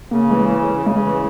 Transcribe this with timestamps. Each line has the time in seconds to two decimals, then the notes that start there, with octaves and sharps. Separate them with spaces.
0.11 C#3 A#3
0.30 E3 G#3
0.49 C#3
0.67 C#3
0.86 C#3 G#3
1.05 E3